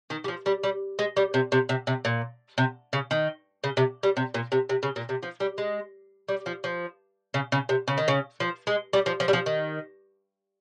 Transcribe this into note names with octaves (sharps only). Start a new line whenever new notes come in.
D#3
G3
F3
G3
G3
G#3
G3
C3
C3
C3
C3
A#2
C3
C#3
D#3
C#3
C3
G3
C3
A#2
C3
C3
C#3
A#2
C3
F3
G3
G#3
G3
F3
F3
C#3
C#3
C3
C#3
D#3
C#3
F3
G#3
G3
F3
F3
G3
F3
D#3